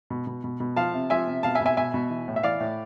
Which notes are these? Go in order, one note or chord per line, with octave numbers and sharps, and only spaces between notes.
B2
B2
B2
B2
F3 F5 A5
C3
F3 E5 G#5
C3
B2 F5 A5
E5 G#5
B2
E5 G#5
B2 E5 G#5
B2
E3
A2
E5
E3 D5 F5
A2